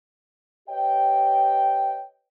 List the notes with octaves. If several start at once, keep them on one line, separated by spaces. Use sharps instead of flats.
G4 B4 C#5 D#5 G5